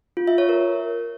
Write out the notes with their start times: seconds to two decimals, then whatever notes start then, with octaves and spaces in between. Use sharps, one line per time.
0.17 F4
0.28 E5
0.38 C#5
0.49 A#4